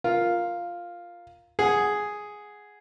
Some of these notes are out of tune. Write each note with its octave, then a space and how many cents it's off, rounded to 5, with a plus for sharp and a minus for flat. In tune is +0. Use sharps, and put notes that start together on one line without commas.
F4 +0 A#4 +0
G#4 +0 F#5 +0